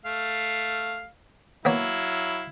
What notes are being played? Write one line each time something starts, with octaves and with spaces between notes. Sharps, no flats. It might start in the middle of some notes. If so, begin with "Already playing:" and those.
A3 F5
F#3 A#3 B3 E4 C#5 F5